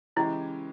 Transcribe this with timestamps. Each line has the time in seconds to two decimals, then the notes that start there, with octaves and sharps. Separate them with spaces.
0.16 C#3 E3 G#3 C#4 E4 G4